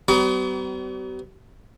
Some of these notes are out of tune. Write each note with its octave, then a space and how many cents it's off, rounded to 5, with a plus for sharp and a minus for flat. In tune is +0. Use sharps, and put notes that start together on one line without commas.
G3 -45 B3 +35 C#6 +45